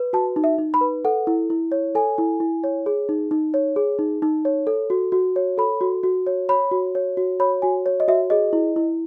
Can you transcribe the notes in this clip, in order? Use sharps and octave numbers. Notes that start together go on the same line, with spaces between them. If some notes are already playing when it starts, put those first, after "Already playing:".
Already playing: B4
F#4 A5
D#4
E5
D#4
B5
B4
A4 F#5
E4
E4
C#5
A4 G#5
E4
E4
C#5
G#4
D#4
D#4
C#5
G#4
D#4
D#4
C#5
A4
F#4
F#4
C#5
A4 B5
F#4
F#4
C#5
C#5 B5
F#4
C#5
F#4
C#5 B5
F#4 G#5
C#5
D#5
F#4 E5
G#4 D#5
E4
E4